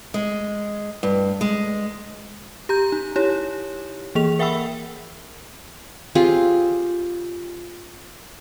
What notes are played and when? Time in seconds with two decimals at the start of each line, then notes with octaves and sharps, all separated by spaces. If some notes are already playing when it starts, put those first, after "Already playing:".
0.14 G#3
1.03 G2
1.41 G#3
2.69 G4 A#5 G6
2.92 D#4
3.16 D#4 E4 G4 C#5
4.15 E3 A#3 G#4 F7
4.39 A#4 E5 F#5 G5 B5 E6
6.15 C4 F4 G4 G#4